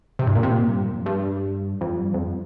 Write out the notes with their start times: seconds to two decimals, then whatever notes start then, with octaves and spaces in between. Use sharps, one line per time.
0.19 C3
0.27 G2
0.35 A#2
0.43 C3
0.51 A#2
0.68 G2
0.84 F2
0.95 G2
1.06 G2
1.81 F2
1.97 G2
2.14 F2